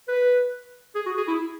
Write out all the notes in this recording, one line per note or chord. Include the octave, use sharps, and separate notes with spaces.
B4
G#4
F#4
G#4
E4